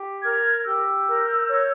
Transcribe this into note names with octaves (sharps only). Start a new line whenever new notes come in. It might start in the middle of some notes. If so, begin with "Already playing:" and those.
Already playing: G4
A#4 F6 G#6
G4 E6 G6
A#4
C#5